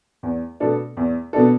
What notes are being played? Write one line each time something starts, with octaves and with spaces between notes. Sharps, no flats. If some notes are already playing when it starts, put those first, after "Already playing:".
E2
B2 B3 D4 A4
E2
B2 B3 D4 A4